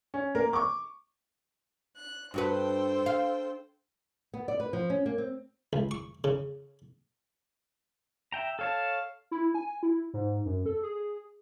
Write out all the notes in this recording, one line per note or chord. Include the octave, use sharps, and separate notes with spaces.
C#4
A#3 A#4
C#6 D6
F#6
G2 F#4 A4 B4 C5 G5
F5
B3
D5
B4
F3
C#4
A#3
C4
C#2
C#6
C#3
E5 G5 A#5
A4 C#5 F5 A5
E4
G#5
E4
G#2
F#2
A4
G#4